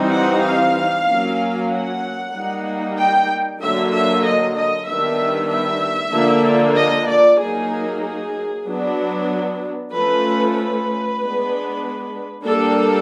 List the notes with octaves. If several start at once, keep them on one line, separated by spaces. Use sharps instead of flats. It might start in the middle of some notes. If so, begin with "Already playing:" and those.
Already playing: E3 G3 C4 D#4
F#5
F5
F#3 A#3 C#4
F#5
G3 A#3 D#4
G5
D3 F#3 A#3 E5
E5
D#5
D#5
D#3 G3 B3 D4 E5
E5
D3 F3 A#3 D4
D#5
D5
F#3 A#3 D#4 G#4
G#4
F#3 B3 D4
F3 A3 C#4 B4
B4
G#3 B3 D4
G3 A#3 D4 A4